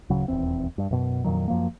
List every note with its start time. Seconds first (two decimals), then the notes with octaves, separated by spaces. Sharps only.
0.10 D1 C#3 F#3
0.28 D#1 E2 C4
0.78 G2
0.91 F#2 B2
1.24 F2 A#2 D#3 F#3
1.48 F#2 F3 A#3